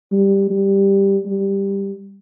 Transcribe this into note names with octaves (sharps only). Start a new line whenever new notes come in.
G3
G3
G3